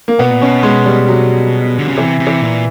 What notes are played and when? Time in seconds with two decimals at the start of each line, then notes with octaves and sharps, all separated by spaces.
0.08 A#3
0.19 B2 B3
0.30 A#2
0.41 B2 C#4
0.63 G#3
0.86 G3
1.09 F#3
1.78 D3
1.88 C#3
1.97 C3 E3
2.20 C3
2.27 E3
2.42 A#2